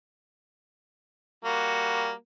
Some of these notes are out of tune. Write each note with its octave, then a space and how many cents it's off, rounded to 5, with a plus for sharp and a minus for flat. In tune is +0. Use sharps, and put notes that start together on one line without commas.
G3 +0 A#3 +0 F#4 +0